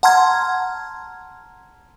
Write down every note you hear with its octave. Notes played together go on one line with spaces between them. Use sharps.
F#5 A5 A#5 C6 F6 G#6